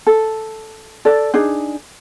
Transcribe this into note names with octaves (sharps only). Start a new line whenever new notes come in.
A4
A4 D5
D4 D#4 G#4